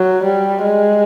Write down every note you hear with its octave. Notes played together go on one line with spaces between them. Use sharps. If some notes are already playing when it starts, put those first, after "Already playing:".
Already playing: F#3
G3
G#3